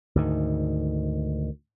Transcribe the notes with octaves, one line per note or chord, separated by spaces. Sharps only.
D2 G#2 D#3